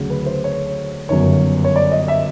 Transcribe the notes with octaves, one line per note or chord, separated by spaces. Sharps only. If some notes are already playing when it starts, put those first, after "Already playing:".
Already playing: D2 C#3 F#3
B4
C5
C#5
G1 F#2 D#3 F#3 C#5
C#5
D5
D#5
E5